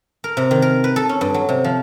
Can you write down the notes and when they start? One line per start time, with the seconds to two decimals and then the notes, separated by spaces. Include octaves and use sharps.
0.24 A#4
0.37 C3
0.51 D#3
0.62 A#4
0.84 B4
0.96 A4
1.09 C#4
1.21 G2
1.34 F#3
1.49 C3
1.64 F3